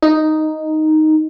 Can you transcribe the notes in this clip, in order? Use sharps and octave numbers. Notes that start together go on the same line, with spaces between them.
D#4